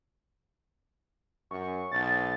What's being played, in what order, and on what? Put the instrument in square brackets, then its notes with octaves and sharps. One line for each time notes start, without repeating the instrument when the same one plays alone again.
[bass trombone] F#2 [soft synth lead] C#6
[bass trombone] B1 [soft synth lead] A6